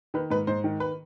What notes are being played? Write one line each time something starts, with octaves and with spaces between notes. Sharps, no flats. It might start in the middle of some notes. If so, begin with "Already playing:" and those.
D#3 B4
G#2 B4
G#2 C5
D#3
B4